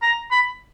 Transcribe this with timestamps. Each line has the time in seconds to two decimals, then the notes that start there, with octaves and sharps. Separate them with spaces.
0.02 A#5
0.31 B5